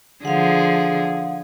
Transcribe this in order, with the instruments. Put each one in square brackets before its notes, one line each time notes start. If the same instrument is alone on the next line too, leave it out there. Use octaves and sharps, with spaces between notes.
[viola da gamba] D3 F3 G#4 [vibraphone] F5 F#5